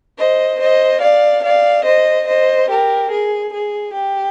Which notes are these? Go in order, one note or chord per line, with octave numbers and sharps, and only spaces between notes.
C5 D#5
C5 D#5
D5 F5
D5 F5
C5 D#5
C5 D#5
G4 A#4
G#4
G#4
G4